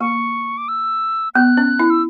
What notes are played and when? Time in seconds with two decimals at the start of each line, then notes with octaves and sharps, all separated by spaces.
0.01 A#3 C#6
0.58 D6
0.68 E6
1.35 B3 F#6
1.57 C#4
1.79 E4
1.90 E6